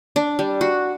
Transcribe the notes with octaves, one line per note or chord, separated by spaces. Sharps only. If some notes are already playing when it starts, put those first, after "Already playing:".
D4
G3
F#4